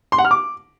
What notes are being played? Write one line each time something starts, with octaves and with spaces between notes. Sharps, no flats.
C6
F#5
F6
D6